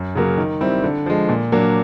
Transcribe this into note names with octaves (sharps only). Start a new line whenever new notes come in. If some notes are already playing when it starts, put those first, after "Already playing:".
Already playing: F#2
C#3 F#3 A#3
D#3
G3 C4 E4
D3
F3 G#3
A#2
F#3 A#3 D4